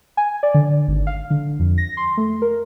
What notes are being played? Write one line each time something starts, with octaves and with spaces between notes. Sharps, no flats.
G#5
D5
D3
G#1
F5
D3
F2
A#6
C6
A3
A#4